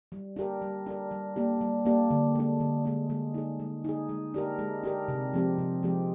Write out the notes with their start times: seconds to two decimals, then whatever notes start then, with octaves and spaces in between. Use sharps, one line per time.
0.12 G3
0.36 D4 G4 A#4
0.62 G3
0.86 D4 G4 A#4
1.11 G3
1.36 A#3 D4 G4
1.61 G3
1.85 A#3 D4 G4
2.11 D3
2.35 G#3 D4
2.60 D3
2.85 G#3 D4
3.10 G#3
3.34 D#4 G#4
3.60 G#3
3.84 D#4 G#4
4.09 G#3
4.34 D4 G4 A#4
4.59 G#3
4.83 D4 G4 A#4
5.08 C3
5.33 F3 G#3 C4 G4
5.58 C3
5.83 F3 G#3 C4 G4